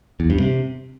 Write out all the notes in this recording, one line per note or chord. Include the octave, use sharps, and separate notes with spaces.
E2
G2
C3